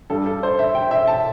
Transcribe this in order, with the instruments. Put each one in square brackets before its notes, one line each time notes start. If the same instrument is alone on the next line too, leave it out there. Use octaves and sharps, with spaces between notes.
[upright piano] G2 G3 D4 A4
A4
C5
E5
G5
E5
A5